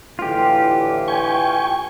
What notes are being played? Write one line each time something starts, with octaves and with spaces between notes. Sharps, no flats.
A2 D3 E3 F4 G4
G5 G#5 C#6